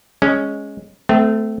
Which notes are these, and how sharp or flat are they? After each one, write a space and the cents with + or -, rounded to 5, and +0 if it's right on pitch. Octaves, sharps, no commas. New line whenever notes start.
G#3 +0 C#4 +0
A3 +0 C4 -35